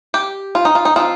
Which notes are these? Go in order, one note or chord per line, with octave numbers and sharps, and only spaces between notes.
G4
F4
D#4
F4
D#4
F3 C4 D#4 F4